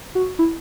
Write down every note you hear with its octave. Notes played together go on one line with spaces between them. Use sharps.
F#4
E4